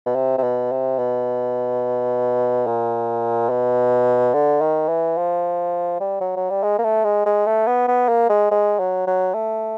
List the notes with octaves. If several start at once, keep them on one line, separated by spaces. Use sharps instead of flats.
B2
C3
C3
B2
C3
B2
A#2
B2
D3
D#3
E3
F3
G3
F#3
F#3
G3
G#3
A#3
A3
G#3
G#3
A3
B3
B3
A#3
G#3
G#3
F#3
F#3
A3